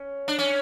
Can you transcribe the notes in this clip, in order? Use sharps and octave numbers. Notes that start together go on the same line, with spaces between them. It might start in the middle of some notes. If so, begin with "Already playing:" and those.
Already playing: C#4
D4
C#4